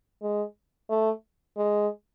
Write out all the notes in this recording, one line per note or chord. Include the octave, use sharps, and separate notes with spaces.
G#3
A3
G#3